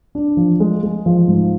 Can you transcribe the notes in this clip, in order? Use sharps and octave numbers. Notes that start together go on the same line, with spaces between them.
D4
F3
G#3
G#3
F3
G#2